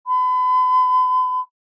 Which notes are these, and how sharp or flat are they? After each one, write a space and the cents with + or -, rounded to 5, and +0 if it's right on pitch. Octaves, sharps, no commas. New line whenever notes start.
B5 +40